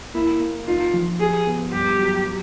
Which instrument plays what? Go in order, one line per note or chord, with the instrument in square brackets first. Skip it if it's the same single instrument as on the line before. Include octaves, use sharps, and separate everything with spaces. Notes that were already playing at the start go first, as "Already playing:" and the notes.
[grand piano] A#3 [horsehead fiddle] E4
[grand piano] A#3
[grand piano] D#4 [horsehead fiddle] F4
[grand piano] F3
[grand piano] G4 [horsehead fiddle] G#4
[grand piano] B3
[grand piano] G2 [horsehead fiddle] G4
[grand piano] F#3
F#3